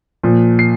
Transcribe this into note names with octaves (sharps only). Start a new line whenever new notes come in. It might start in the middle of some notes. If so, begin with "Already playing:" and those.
A#2 F3
C7